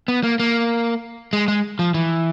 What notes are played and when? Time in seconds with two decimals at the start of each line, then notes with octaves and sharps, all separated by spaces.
0.08 B3
0.23 A#3
0.40 A#3
1.33 G#3
1.48 G#3
1.79 F3
1.94 E3